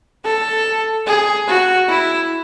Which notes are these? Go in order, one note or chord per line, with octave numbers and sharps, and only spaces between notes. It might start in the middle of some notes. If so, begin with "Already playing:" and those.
A4
G#4
F#4
E4